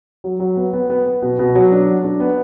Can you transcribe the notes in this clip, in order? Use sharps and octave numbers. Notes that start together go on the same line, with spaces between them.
F#3
F#3
B3
B3
B3
B3
B2
B2
F#3
D4
F#3
D4
B3